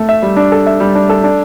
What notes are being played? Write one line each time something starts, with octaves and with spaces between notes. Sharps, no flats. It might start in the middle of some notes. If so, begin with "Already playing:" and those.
Already playing: A3
E5
G3
D4
A4
E5
G3
D4
A4
D4